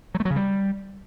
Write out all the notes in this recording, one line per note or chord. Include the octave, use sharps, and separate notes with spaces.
F#3
A3
F#3
C#3
G3